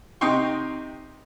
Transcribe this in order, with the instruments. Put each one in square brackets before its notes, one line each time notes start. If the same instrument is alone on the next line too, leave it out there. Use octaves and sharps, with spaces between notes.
[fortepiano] C3 D#4 G5 C6 C#6